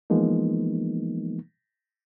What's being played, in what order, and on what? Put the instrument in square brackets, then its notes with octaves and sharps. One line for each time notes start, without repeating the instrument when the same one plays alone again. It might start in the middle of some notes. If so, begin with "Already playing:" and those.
[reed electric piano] E3 F3 G#3 A#3 B3 D#4